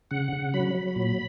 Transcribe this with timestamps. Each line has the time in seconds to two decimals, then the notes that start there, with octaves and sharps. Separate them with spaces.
0.11 C#3 F#5
0.33 C#3
0.54 F#3 B5
0.75 F#3
0.96 A#2